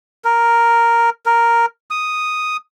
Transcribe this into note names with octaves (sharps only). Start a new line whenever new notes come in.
A#4
A#4
D#6